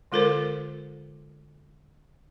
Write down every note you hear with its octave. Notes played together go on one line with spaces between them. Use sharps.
D3 G#3 F4 A4 A#4 C5